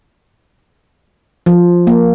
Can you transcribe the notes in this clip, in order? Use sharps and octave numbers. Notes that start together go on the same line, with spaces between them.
F3
A#3